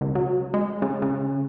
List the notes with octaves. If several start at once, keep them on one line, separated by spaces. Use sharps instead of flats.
C#2
F#3
G#3
C#3
C#3